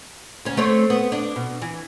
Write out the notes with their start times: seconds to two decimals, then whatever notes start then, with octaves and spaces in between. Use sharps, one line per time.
0.45 D2 C#4
0.57 A3 C4 C#5
0.90 B3
1.12 D4
1.36 B2
1.62 E3